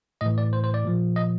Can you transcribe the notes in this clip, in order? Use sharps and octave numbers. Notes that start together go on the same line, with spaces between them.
A2 E3 D#5
D5
C5
C5
D5
A#2 F3
D#5